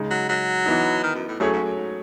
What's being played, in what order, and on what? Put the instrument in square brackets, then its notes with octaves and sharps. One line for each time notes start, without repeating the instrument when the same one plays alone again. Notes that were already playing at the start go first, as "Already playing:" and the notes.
Already playing: [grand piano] C#3 G#3 D#4
[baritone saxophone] F#3
F#3
[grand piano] E3 B3 D#4
[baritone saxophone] D#3
F#2
A2
[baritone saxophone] A2 [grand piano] F#3 A3 C#4 G#4 C#5
[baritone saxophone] G#2
F#2
G#2